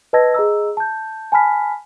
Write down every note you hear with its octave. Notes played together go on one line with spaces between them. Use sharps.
B4 D#5 A5 E6 G#6 A#6
G#4 D#5 A#5 E6
A5 G6
G#5 A5 B5 F6 B6